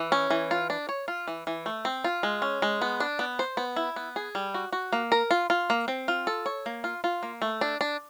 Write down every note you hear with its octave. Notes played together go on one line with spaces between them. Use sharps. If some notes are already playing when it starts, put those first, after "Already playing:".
Already playing: E3
C#4
E3
F4
D4
C#5
F4
E3
E3
A3
C4
F4
G#3
C#4
G#3
B3
D4
B3
C5
B3
E4
B3
G#4
G3
F#4
F#4
A#3
A#4
F4
F4
A#3
C4
F4
A4
C#5
A#3
F4
F4
A#3
A3
D4
D4